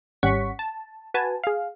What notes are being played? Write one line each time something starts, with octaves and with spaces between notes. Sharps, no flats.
G#1 G3 C#4 F#5 C#6 B6
A5
F#4 B4 G#5 A5
G#4 F5